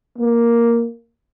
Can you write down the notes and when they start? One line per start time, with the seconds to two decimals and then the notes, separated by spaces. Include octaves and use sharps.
0.17 A#3